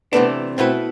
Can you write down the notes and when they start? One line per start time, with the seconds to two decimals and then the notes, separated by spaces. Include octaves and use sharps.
0.12 C3 E3 A3 B3 D4
0.57 B2 A3 C4 E4 B4